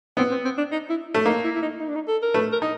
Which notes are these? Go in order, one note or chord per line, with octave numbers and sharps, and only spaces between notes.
B3 C4
C4
C4
D4
D#4
E4
A3
A#3 D#4
E4
E4
D#4
D#4
D4
D#4
A4
A#4
A3 B4
A#4
D#4